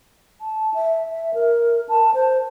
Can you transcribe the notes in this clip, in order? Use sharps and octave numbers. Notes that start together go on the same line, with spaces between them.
A5
E5
E5
A#4
A5
C5